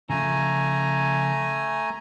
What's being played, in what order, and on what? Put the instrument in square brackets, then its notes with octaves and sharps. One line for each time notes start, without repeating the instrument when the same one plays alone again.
[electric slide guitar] C#3 F3 [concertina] A3 G#5 A#5